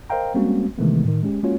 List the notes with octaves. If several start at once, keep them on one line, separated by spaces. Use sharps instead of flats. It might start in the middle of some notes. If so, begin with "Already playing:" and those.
A#4 C5 D#5 F5 G5 A#5
G3 G#3 A#3 C4 C#4 F#4
C3 D#3 E3 G#3 A3 B3
A2 D#3
G#3 C#4 G4
G#3 A#3 C#4 F4 F#4 C#5